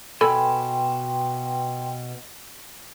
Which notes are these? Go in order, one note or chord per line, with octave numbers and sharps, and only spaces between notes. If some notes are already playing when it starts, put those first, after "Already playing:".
B2 A4 B4 G5 G#5 B5 C6